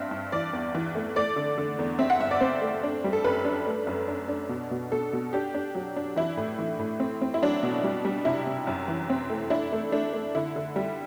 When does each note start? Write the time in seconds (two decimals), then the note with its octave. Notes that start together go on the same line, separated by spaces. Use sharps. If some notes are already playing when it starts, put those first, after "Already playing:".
Already playing: G2 C4 D4 E5
0.11 G2
0.32 E3 D5
0.53 E2
0.75 E3
0.95 A3
1.16 A3 D5
1.36 D3
1.58 D3
1.79 E2
1.99 C4 E5
2.10 F#5
2.20 G2 E5
2.31 D5
2.41 C4 C5
2.62 A3
2.83 D4
3.04 G3
3.13 A4
3.24 F#2 B4
3.45 D4
3.67 A3
3.87 F#2
4.08 D4
4.28 D4
4.49 B2
4.71 B2
4.92 B2 A4
5.13 B2
5.33 D4 G4
5.54 D4
5.75 F#3
5.96 D4
6.16 E3 E4
6.37 A2
6.59 E3
6.79 A2
7.00 C4
7.22 C4
7.34 E4
7.42 F#3 D4
7.63 B2
7.84 G3
8.05 G3
8.25 C3 E4
8.46 C3
8.67 F#2
8.88 E3
9.10 C4
9.30 A3
9.50 D4 E4
9.72 A3
9.92 A3 D4
10.13 A3
10.35 D3 E4
10.56 D3
10.76 G3